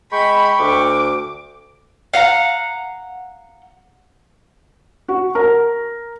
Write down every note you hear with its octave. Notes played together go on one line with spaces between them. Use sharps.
G#3 G5 B5 C#6
D2 D6
F5 F#5 A#5
F#4
A#4